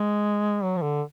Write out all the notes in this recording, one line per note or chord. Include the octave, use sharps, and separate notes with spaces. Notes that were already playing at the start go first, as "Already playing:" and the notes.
Already playing: G#3
F#3
F3
D3